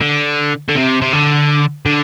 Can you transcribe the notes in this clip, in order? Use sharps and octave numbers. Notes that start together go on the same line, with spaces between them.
D3
D3
C3
C3
D3
D3